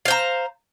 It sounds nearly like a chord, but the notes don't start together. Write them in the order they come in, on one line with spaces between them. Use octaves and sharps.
F5 C5 A#5